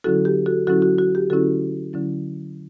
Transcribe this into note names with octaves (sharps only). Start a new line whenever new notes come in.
D3 F#3 C#4 E4 F#4 A4
G4
F#4 A4
D3 F#3 C#4 E4 F#4 A4
F#4
F#4
G4
D3 F#3 C#4 E4 F#4 A4
D3 F#3 C#4 E4